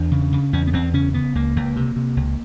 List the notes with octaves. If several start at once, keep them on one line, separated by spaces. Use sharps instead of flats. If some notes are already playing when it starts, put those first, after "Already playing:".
Already playing: E2 D4
C#3
C#3
E2 C#4
B3
E2 C4
C#3 C#4
C#3 B3
C#2 A#3
C#2
C3
C3
C#2